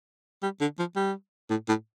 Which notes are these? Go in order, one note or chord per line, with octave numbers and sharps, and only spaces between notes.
G3
D3
F3
G3
A2
A2